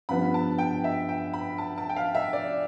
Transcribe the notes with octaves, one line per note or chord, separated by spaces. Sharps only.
G2 F3 B3 B5
A5
G5
E5
G5
B5
A5
A5
G5
F5
E5
D5